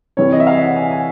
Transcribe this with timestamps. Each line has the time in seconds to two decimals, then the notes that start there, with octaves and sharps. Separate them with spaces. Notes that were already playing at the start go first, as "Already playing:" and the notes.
0.17 C3 E3 G3 C#5
0.32 D#5
0.40 E5
0.47 F5
0.61 F#5
0.76 G#5
0.91 G#5